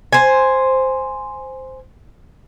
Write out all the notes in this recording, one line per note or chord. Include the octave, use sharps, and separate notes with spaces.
C5 G#5